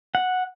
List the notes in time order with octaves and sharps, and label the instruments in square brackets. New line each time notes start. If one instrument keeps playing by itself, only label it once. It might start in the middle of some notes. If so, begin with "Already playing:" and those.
[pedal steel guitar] F#5